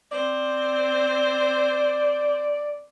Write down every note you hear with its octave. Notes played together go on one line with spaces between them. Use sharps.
C4 C5 D5